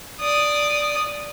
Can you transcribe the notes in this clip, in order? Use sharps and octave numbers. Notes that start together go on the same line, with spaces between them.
D5 D#6